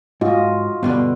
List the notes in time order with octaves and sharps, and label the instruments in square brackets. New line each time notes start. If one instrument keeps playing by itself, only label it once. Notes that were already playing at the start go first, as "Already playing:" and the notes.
[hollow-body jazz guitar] G#2 [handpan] F4 F#4 D#5
[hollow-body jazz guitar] G2 B2 D3 [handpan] B3